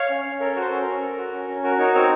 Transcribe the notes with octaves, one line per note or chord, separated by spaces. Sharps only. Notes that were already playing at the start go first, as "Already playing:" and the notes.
Already playing: C#5 F5
C#4
C#4
A4 A#4 C#5
F#4 A4 C5
C#4
A#4
C#4
A4
F#4
C#4
C#4
F#4 A#4
D#4 A#4 C#5
C4 A#4 C#5